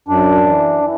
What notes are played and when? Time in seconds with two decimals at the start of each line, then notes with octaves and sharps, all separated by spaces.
0.08 F#2 D4
0.46 E3
0.82 E3